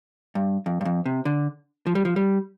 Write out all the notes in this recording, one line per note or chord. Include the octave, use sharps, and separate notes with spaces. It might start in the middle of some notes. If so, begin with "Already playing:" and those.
G2
F2
G2
F2
C3
D3
F3
G3
F3
G3